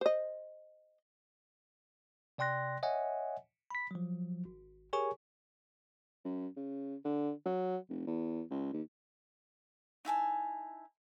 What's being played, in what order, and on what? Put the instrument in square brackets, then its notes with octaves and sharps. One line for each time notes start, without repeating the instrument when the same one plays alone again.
[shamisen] C5 D#5
[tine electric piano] C3 D5 G5 C6 F#6 A#6
C#5 D#5 E5 F#5 G#5
B5 B6
F3 F#3
G#1
G4 G#4 A#4 C#5 G#5 C#6
[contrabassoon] F#2
C#3
D3
F#3
F1
E2
C#2
D#2
[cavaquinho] D#4 E4 G#5 A5